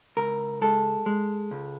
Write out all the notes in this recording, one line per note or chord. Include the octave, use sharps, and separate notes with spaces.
C#2 A#4
G#3 A4
G#3
C#2